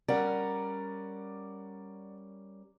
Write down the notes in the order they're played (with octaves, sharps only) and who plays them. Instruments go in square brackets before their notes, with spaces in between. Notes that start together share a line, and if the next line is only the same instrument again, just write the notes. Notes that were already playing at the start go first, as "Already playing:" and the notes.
[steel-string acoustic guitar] G3 C#4 A#4 [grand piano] D5 F#5